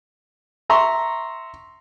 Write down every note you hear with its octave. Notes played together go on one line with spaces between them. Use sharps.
E5 A#5 C6 C#6